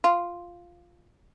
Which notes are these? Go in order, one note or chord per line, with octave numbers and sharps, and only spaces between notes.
F4